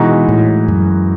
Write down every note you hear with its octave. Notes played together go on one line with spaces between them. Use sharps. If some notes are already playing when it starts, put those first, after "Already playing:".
Already playing: B2 E3 G#3 D#4 F#4
A2
F#2